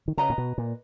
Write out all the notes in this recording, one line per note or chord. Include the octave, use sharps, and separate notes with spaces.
D#3
C#3 B4 D#5 A#5
A#2
B2
A#2